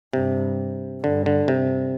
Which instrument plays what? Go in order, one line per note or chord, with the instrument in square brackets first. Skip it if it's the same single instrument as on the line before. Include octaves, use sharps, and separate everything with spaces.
[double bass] G2 [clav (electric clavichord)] C3
[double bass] G2 [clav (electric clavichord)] D3
[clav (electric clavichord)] D3
C3